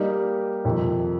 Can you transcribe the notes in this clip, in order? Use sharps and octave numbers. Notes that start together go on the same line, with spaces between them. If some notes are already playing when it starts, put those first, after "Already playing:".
Already playing: G3 A#3 D#4 G4
F2 C3 D#3